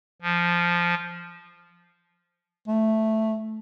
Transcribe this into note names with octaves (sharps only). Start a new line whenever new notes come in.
F3
A3